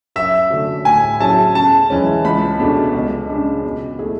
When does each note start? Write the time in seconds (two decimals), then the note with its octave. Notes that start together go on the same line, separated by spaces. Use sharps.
0.16 F#2 E5
0.50 D3 A3 D4 F#4
0.85 A2 G#5
1.20 F#3 C#4 E4 G#4 A5
1.55 C#3 A5
1.90 E3 G#3 C#4
2.25 C#2 B5
2.60 B2 A3 D4 G#4
2.95 C#2
3.29 C#3 G#3 D4
3.64 B2
3.99 A3 E4 G#4